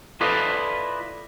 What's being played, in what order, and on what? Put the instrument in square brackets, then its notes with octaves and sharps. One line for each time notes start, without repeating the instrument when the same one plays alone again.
[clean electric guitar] E4 F4 A4 B4 D5 D#5